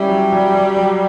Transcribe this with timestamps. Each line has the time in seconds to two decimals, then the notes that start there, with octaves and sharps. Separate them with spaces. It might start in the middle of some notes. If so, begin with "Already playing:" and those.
Already playing: G3 C#4 E4
0.09 F#3
0.32 F#3
0.54 F#3
0.77 F#3